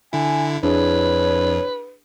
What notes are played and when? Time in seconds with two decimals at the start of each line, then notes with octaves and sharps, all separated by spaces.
0.13 D3 E4 G#5
0.63 F2 D4 E4 G#4 B4 C#5